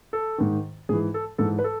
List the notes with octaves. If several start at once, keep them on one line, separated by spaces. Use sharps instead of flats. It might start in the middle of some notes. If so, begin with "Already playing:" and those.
A4
G#2 D#3
G#2 E3 G#4
A4
G#2 E3 A4
B4
A4